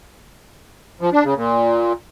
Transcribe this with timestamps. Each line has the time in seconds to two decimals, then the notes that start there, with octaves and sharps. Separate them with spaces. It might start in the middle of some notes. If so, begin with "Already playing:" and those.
1.01 F3
1.13 D4
1.24 C#3
1.36 A#2